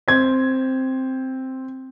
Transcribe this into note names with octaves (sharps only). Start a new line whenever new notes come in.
C4 G#6